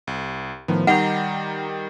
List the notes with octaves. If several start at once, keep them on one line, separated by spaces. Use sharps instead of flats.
C2
A2 D#3 F3 B3
D#3 G3 D#4 F#5 A#5 G6